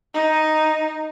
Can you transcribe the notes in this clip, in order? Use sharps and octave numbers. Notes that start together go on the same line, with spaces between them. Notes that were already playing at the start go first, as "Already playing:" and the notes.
D#4